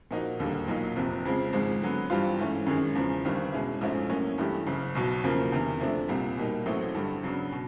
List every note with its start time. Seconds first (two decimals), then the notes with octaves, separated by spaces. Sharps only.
0.11 A#2 F3 A#3 D#4 F#4
0.39 E1 D#2 D3 G3 A#3
0.68 B1 A#2 F#3 A#3 D#4
0.96 F1 F2 C3 F3
1.25 F2 C#3 F3 G#3
1.53 G#1 G#2 F3 G#3
1.82 D3 F#3 B3
2.10 G2 E3 G3 C4 F4
2.38 G#2 E3 A3 C#4
2.66 F#2 D#3 G#3 C#4
2.95 E2 C#3 F3
3.24 G1 G2 D#3 G3 C4
3.52 B2 G#3 C#4 E4
3.81 A#1 G#2 F3 A3 C#4
4.09 A2 F#3 A#3 C#4
4.38 G2 E3 A3 D4 G4
4.66 F#1 F#2 C#3
4.95 B1 B2 F#3
5.23 E2 C#3 F3 A#3
5.52 E2 C3 D#3
5.80 C3 F3 A3 D4
6.08 C2 A#2 G3
6.37 B2 G3 A#3 D#4
6.66 A1 A2 F#3 A3 C4
6.94 G2 D3 G3
7.23 C#3 F#3 B3 D4
7.52 B2